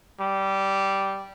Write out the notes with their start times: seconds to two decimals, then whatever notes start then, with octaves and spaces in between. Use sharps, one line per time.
0.20 G3